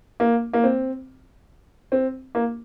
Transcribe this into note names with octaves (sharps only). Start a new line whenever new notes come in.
A#3
A#3
C4
C4
A#3